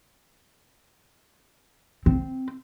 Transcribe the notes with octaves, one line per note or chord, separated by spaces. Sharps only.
C4